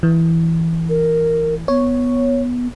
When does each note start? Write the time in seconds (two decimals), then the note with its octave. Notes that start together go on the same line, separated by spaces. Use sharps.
0.03 E3
0.89 A#4
1.68 B3 C#5